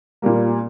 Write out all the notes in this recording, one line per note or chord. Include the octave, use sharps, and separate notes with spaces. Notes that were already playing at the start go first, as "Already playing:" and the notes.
A#2 G3 A#3